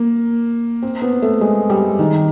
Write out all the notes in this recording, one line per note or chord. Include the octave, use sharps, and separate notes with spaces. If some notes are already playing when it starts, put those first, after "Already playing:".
Already playing: A#3
C4
B3
A3
G#3
G3
D#3